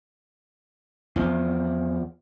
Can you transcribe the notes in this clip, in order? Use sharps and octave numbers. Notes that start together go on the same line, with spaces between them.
E2 F3